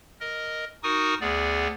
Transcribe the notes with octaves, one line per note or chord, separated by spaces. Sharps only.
A#4 D#5
D#4 F#4 A#4 G#5 C#6 D#6
D2 B3 G#4 D5